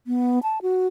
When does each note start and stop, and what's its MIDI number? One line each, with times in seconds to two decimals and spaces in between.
0.07 0.39 59
0.43 0.59 81
0.62 0.87 66